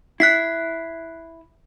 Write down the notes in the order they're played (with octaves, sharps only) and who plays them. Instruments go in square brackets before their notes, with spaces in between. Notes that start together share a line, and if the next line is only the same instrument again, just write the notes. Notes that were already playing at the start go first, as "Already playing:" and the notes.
[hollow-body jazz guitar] E4 [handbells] F#6 B6 C7